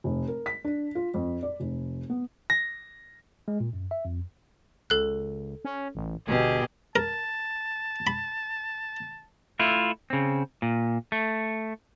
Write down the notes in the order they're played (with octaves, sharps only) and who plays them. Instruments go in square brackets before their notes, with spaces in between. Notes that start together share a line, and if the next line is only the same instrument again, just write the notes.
[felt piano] F1
A#4
B6
D4
F4
F2
D5
F1
B3
[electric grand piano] A#6
[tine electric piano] G#3
A#2
F#2
E5
F2
[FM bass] C#2 [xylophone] A4 F#6
[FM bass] C#4
A1
[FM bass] G1 [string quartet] B2 G4 G#4
[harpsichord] A#4 [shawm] A5
[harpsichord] B5
[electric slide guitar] A3 E4 F4
C#3 C4
A#2
A3